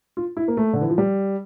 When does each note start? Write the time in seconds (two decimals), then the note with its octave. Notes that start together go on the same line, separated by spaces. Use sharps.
0.17 F4
0.37 E4
0.48 A#3
0.57 A3
0.73 D3
0.81 E3
0.90 F3
0.98 G3